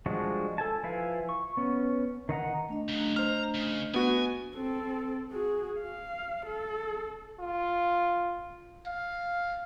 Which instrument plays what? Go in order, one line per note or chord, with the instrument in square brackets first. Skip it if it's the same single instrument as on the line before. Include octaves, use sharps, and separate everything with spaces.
[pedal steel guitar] F3 G3 G#3 D4 F#4
A4 G#5 A5
F3 E4 B4 F5 G#5
C#6
B3 C#4
D#3 D#4 F#5 A#5
[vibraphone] A3 D4 D#5
[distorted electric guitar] C#3 F#3
[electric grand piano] C5 F6 [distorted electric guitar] A#5
[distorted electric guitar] C#3
[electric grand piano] B3 F#4 [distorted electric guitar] G#5
[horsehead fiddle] C4 A4
F#4 G#4
F5
A4
[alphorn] F4
[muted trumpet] F5